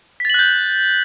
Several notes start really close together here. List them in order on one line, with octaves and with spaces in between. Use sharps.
B6 A6 F#7 F#6 G6